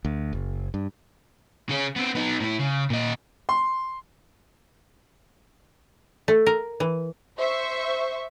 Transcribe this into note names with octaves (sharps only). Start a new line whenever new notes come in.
D2
F#1
G2
C#3 C#4
B3 C4
B3 D#4
A2 E4
C#3
A#2 D#5
C6
A3
A#4
E3
C5 E5 C#6